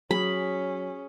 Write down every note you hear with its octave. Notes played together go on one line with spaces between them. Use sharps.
F#3 C#4 G#4 B5